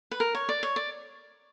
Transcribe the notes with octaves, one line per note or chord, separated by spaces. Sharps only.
B4
A#4
C#5
D5
C#5
D5